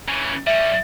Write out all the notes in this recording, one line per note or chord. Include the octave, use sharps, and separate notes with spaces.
C#3 E3
G3 C#4 E5